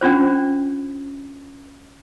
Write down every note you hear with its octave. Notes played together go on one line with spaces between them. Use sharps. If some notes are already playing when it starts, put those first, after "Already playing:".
C#4 D4 F4 C5